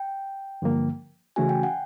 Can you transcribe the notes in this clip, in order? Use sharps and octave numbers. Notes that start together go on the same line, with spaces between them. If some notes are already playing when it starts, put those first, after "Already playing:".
Already playing: G5
G2 D3 F3 A#3
C#3 E3 A3 C#4 F#4 G#5
G5
F#5